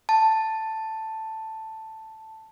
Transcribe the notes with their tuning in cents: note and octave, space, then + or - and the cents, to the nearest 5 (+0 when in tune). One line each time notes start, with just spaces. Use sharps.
A5 +5